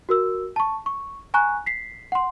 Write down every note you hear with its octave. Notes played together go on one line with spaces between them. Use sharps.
F#4 A#4 E6
A5 C#6
C#6
G#5 A#5 C#6 F#6
B6 C7
F#5 C6